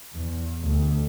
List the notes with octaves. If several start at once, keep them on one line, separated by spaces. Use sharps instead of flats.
E2
D2